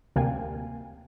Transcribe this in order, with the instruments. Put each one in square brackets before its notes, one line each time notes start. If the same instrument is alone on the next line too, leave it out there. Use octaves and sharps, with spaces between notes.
[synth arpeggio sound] D2 C3 A#3 F5 G5 G#5